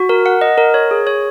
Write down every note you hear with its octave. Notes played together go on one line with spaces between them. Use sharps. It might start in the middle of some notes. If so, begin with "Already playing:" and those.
Already playing: F#4
A#4
F#5
D#5
A#4
C#5
G#4
C#5